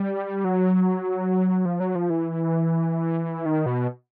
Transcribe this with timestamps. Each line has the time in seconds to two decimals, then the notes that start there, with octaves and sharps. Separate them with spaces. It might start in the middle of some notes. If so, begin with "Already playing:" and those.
Already playing: G3
0.44 F#3
1.65 F3
1.80 F#3
1.95 F3
2.10 E3
3.46 D#3
3.66 B2